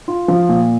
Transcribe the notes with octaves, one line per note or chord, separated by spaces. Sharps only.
F4
F3
A#2